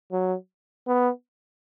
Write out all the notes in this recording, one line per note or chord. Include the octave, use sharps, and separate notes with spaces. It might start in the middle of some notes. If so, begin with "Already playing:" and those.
F#3
B3